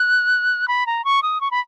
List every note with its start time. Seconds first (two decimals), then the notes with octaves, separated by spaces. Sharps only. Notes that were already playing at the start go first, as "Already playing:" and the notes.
Already playing: F#6
0.68 B5
0.86 A#5
1.05 C#6
1.22 D#6
1.41 C#6
1.51 B5